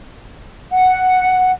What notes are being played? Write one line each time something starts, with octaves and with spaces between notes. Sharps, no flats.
F#5